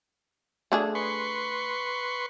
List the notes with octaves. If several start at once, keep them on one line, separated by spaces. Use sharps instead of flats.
A3 D4 G#4
B4 C6 C#6